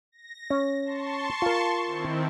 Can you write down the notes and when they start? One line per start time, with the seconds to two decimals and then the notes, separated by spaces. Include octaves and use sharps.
0.12 A#6
0.50 C#4
0.84 A5 C6 C#6
1.42 F4 A#4
1.86 D#3 C4 E4